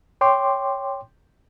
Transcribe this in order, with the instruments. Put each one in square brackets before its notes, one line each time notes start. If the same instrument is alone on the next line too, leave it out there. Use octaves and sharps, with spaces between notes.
[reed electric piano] C#5 G5 C6 D6